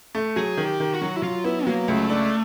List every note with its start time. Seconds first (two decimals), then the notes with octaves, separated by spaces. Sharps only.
0.15 A3
0.36 F#3 G#4
0.57 D#3
0.65 G4
0.80 D#3
0.94 F#4
1.02 F#3
1.16 E4
1.22 F#3 F4
1.44 B3 E4
1.66 F#3 A#3
1.88 C#2 A3
2.10 D4